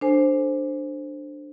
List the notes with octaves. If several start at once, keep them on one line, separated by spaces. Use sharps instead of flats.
D4 A4 C5 G#5